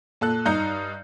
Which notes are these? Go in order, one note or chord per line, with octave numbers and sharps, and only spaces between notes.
A#2 A4 F#6
G2 D#4 A#5 G6 C#7